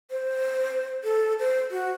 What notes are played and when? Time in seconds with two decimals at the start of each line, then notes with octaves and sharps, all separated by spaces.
0.11 C5
1.04 A4
1.39 C5
1.71 F#4